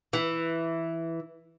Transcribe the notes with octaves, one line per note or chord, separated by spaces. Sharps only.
E3